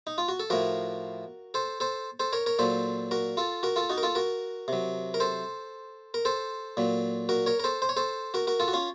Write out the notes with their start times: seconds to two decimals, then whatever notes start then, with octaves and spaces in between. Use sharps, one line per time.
0.07 D#4
0.18 F4
0.28 F#4
0.40 A4
0.50 A2 F3 F#4 A#4
1.54 A4 C5
1.80 A4 C5
2.20 A4 C5
2.33 A#4 C#5
2.46 A#4 C#5
2.59 A#2 F#3 A4 C5
3.11 F#4 A#4
3.37 F4 A4
3.63 F#4 A#4
3.76 F4 A4
3.90 D#4 F#4
3.98 A#4
4.03 F4 A4
4.15 F#4 A#4
4.68 C3 F#3
5.14 A#4
5.20 A4 C5
6.14 A#4
6.25 A4 C5
6.77 A#2 F#3
7.29 F#4 A#4
7.46 A#4 C#5
7.60 A#4
7.64 A4 C5
7.82 C5
7.89 C#5
7.97 A4 C5
8.34 F#4 A#4
8.47 F#4 A#4
8.60 F4 A4
8.68 F#4
8.73 C#4 F4